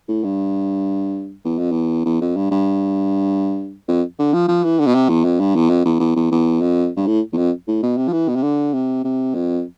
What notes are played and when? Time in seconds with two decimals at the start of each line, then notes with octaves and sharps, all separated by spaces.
0.08 A2
0.24 G2
1.45 E2
1.58 F2
1.71 E2
2.05 E2
2.21 F2
2.37 G2
2.51 G2
3.89 F2
4.19 D3
4.33 F3
4.48 F3
4.64 E3
4.79 D3
4.87 B2
4.95 C3
5.09 E2
5.24 F2
5.40 G2
5.55 E2
5.70 F2
5.85 E2
6.00 E2
6.16 E2
6.31 E2
6.61 F2
6.96 G2
7.07 A2
7.33 E2
7.37 F2
7.68 A2
7.83 B2
7.97 C3
8.08 F3
8.13 E3
8.28 B2
8.35 C3
8.43 D3
8.73 C3
9.04 C3
9.35 F2